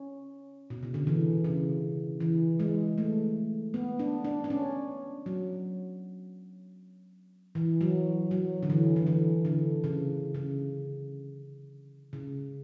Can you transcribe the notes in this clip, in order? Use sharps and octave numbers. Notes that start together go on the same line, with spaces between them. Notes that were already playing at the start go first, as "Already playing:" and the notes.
Already playing: C#4
B2
C#3
D3
E3
C#3
E3
G#3
A3
B3
D4
D4
D4
C#4
F#3
E3
F#3
F#3
D3
E3
D3
E3
D3
C#3
C#3
C#3